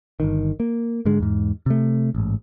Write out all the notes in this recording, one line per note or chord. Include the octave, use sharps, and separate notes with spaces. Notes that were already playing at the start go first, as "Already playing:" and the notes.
G1 C2 D#3
A#3
G#2 D3 G#3
E2 G#2
C3 A3
A1 G#2